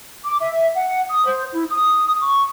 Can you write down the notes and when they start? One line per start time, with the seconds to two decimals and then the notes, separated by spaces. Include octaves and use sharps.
0.24 D6
0.40 E5
0.74 F#5
1.08 D#6
1.25 C5
1.52 E4
1.70 D#6
2.21 C#6